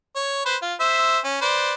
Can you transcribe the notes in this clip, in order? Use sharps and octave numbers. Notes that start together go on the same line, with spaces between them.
C#5
B4 C5
F4
C5 E5
C#4
B4 C5 D5